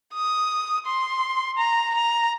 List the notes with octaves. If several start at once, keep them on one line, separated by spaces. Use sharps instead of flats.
D#6
C6
A#5
A#5